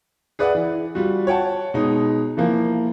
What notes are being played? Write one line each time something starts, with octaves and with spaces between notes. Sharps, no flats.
G#4 B4 D5 E5 F#5
E3
G3 F4 F#4
C#5 F#5 G5 A5
B2 G#3 D#4
E3 F3 A#3